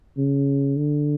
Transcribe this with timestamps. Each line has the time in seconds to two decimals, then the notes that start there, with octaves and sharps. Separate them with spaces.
0.17 C#3
0.77 D3